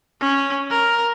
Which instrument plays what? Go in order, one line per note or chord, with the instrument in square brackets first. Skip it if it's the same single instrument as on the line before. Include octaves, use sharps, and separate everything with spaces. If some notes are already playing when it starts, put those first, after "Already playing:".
[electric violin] C#4
A#4